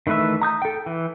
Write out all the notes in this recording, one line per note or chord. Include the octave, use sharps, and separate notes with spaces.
D#3 E3 A3 B4 E5
A#5 D#6 G6
A4 G5
E3